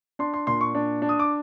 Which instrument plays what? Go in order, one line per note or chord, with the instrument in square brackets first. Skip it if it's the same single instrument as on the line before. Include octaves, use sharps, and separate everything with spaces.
[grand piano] D4 C6
C6
A#2 C6
C#6
D4
D4
D#6
D6